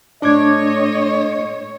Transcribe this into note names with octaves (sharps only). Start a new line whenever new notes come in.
A2 D4 C#5 D#5 D6 G#6